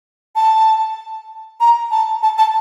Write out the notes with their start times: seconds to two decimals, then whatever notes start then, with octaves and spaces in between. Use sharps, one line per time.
0.36 A5
1.61 A#5
1.91 A5
2.23 A5
2.38 A5